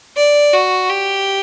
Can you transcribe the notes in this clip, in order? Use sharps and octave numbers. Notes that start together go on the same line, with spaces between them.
D5
F#4
G4